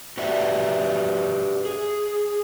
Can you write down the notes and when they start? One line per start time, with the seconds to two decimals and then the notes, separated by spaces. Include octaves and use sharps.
0.17 F#4 G4 B4 D5 E5
1.65 G#4